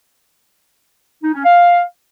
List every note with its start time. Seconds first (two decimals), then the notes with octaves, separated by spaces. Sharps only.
1.23 D#4
1.34 C#4
1.44 F5